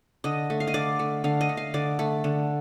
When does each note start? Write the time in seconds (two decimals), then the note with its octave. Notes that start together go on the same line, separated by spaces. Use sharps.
0.24 D3 D#5
0.50 A3
0.60 F5
0.67 D#5
0.74 D3 D5
0.99 A3
1.24 D3 F5
1.41 D#5
1.49 A3
1.57 F5
1.74 D3 D5
1.99 A3
2.24 D3